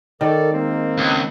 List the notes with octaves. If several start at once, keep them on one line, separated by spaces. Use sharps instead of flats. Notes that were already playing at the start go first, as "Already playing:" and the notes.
D#3 A4 A#4 C#5 D5
G#3 A#3 C4
C#2